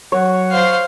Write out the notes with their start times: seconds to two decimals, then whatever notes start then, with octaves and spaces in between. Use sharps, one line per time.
0.12 F#3 C#5 F#5
0.51 C5 F5